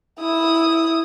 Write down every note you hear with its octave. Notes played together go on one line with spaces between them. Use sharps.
E4 D#6